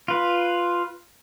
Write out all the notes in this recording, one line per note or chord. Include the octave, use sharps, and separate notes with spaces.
F4 B4